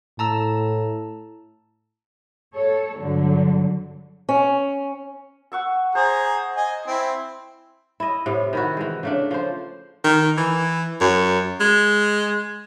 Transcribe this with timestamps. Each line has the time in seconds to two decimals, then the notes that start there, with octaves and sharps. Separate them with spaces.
0.19 A2 A5 A#5 E6
2.55 A4 C#5
2.99 G2 D3 F#3
4.29 C#4
5.52 F#5 C#6 E6
5.95 G#4 C5 A#5
6.56 D#5 G#5
6.87 C4 E4
8.00 E4 D#5
8.26 A2 C3
8.53 D#3 E4 F#4
8.77 E3 G#3
9.03 C#3 A3 D4
9.31 F3 C#4 C5
10.04 D#3
10.37 E3
11.01 F#2
11.60 G#3